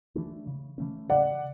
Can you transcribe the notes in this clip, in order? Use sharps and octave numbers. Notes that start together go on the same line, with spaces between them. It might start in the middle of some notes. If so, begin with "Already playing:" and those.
E3 A3 D4
C#3
E3 A3 C#4
C#3 D5 F#5